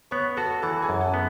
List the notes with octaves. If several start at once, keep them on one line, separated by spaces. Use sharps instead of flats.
B3 C#5 C#6
F#4 A4 A5
E3 A4 A5
G#4 G#5
F#2
A4 A5
B3